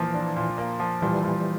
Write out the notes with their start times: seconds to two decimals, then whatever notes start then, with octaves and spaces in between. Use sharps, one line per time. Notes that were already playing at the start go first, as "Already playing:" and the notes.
Already playing: A#2 E3 F3 A#3
0.14 D4
0.36 A#2
0.58 A#3
0.80 F3
1.02 A#2 E3 G3
1.24 A#2